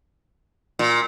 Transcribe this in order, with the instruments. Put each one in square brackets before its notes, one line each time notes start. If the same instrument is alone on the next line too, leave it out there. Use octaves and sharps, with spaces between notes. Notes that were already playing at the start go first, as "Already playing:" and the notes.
[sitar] A#2